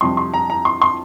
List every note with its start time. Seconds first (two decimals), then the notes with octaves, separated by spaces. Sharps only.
0.01 F2 C3 G3 C6
0.17 C6
0.34 A#5
0.50 A#5
0.65 C6
0.82 C6